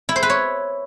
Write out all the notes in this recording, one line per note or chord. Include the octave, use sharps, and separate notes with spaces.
E4
C5
B4
C#5